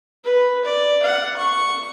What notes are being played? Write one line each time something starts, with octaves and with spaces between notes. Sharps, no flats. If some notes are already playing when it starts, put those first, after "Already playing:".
B4
D5
F#5
C#6